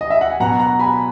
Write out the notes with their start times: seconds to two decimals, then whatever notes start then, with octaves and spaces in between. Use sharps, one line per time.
0.01 D#5
0.10 E5
0.21 F#5
0.31 G#5
0.40 B2 F#3 B3 F#5 A#5
0.59 F#5 A#5
0.80 G#5 B5